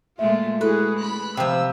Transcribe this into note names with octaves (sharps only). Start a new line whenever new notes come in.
A#2 G#3 A3 F4 E5
G#3 E4 F#4 G#4 A4 B4
B5 F#6
C3 F3 G5 E6